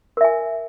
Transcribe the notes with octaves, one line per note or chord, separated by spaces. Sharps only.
A#4 E5 G#5